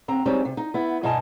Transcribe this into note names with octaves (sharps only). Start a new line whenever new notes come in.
D#2 C4 A#5
G3 G#3 C4 C#4 D#4
C3
D#4
B3 E4
G2 B2 D#4 D#5 G#5 A5